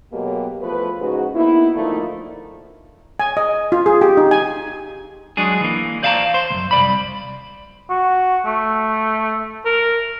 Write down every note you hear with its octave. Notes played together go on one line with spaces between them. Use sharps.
B2 F#3 G#3 A#3 G4
E2 F3 A3 B4
G#2 C#3 F#4
A#3 B3 D#4 E4
D3 F3 A3 A#3 D#4
G#5
D#5
F4
G#4
G4
D#4
G#5
F#3 G#3 D4 G#4
E3 A#3
C5 D5 F5 F#5 A5 A#5
C5
C#2 F#2
C2 F3 D5 B5
F#4
A3
A#4